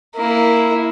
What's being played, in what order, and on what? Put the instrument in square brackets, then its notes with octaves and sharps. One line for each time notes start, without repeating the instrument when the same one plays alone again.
[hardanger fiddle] A#3 E4